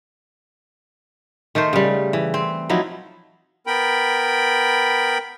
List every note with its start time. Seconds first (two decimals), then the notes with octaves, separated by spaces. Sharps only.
1.55 D#3 A3 A#4 C5
1.73 C#3 G3
2.13 E3
2.34 C4
2.69 F3 F#3 D#4 E4
3.67 B3 A#4 G5 B5